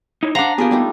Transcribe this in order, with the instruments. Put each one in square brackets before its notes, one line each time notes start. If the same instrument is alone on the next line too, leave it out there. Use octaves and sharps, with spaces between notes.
[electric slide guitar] D#4 E4 C#5
[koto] D4 A#5 [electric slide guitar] C5 F5 F#5
[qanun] A#3 F4 G#4 [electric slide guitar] B3 G4
[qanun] G3 A3 D#4